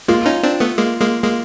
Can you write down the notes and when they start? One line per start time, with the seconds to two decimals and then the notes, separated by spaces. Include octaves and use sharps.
0.08 G#3 A#3 F4
0.26 C#4 D#4
0.43 C4 D4
0.60 A3 B3
0.78 G#3 A#3
1.01 G#3 A#3
1.24 G#3 A#3